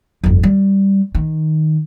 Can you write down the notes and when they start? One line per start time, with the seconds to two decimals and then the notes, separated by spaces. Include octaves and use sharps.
0.24 G1 F2
0.43 G3
1.15 D#3